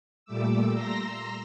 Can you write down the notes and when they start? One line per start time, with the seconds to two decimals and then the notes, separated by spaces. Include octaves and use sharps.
0.25 A#2 G3 A3 D6 E6
0.72 A#5 C6 E6 A#6